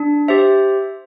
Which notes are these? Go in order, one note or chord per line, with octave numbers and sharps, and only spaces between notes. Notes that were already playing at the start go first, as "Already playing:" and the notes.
Already playing: D4
G4 C5 E5